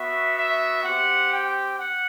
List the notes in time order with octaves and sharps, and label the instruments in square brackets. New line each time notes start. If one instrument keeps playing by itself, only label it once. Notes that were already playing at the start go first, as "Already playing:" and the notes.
Already playing: [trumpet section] B3 F#4 E5
E5
C4 G4 F#5
G5
F#5